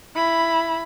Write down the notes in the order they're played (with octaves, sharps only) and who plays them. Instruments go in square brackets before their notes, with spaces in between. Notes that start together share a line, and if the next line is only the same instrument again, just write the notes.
[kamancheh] E4 B5